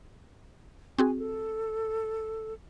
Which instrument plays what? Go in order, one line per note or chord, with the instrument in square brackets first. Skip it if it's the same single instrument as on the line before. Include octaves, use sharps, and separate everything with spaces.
[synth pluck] C4 F#4 G#4 [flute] G#5
[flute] A4